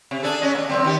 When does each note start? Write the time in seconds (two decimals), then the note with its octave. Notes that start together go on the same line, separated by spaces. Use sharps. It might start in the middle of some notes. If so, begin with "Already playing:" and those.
0.11 C3
0.22 D4 G#4 A4
0.41 C#4 D#5
0.55 A#3 D4
0.69 F#2 A3 C4
0.84 D#3 G4